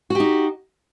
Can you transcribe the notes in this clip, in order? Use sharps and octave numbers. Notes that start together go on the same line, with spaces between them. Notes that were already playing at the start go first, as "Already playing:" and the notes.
D#4 F#4 G4